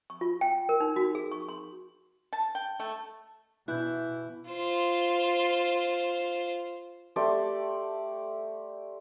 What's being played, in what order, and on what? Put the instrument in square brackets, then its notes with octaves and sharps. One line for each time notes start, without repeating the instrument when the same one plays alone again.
[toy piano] C#6
F4
G5
A#4
D#4
F#4
G#4
C#6
C6
[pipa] A5
G5
A3
[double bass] B2 [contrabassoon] E3 [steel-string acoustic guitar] E4 [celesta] F#6 G6
[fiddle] F4 C5
[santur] A3 G4 C5 D5